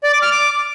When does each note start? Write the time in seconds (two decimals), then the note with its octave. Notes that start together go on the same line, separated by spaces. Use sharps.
0.04 D5
0.13 D6
0.22 F6
0.31 D6